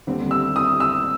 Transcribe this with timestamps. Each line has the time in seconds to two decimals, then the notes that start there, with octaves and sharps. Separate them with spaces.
0.07 D#2 D3 G3 C4
0.31 E6
0.56 D#6
0.80 E6